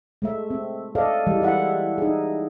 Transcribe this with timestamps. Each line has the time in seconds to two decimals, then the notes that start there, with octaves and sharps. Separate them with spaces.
0.22 G#3 A3 E5
0.50 C4
0.95 A4 D5 D#5 F5
1.27 E3 G3 G#3
1.42 E4 E5 F#5
1.98 D#4 G#4